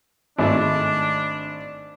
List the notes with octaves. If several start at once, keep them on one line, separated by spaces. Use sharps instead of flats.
G#1 A3 D4 E5